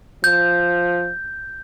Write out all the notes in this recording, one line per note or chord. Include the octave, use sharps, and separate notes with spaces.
F3 G6